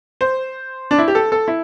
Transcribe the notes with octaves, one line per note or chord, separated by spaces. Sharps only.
C5
D4
E4
G4
A4
A4
E4